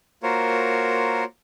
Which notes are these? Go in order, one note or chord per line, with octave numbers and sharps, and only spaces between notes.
A#3 F4 F#4 A#4 C5 C#5